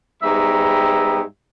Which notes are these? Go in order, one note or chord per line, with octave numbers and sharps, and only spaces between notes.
G#2 G3 B3 E5 G5 A#5